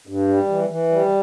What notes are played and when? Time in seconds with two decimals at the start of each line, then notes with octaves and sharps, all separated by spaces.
0.07 G2
0.28 G3
0.49 E3
0.70 E3
0.91 G3